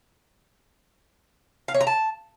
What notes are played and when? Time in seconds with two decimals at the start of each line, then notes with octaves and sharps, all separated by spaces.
1.68 F5
1.74 C#5
1.81 A#5
1.87 A5